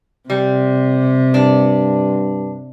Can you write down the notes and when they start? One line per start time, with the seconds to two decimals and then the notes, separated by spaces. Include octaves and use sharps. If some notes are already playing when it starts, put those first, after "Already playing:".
0.30 C3 G3
1.34 G2 D4